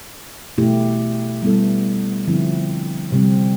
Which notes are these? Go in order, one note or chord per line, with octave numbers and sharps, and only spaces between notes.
B2 A3 E4 G4
G3 B3 E4 A4
D3 F3 C4 E4
C3 G3 C4